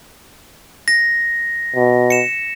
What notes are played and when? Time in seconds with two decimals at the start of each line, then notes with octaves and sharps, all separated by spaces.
0.88 A#6
1.76 B2
2.10 C#7 E7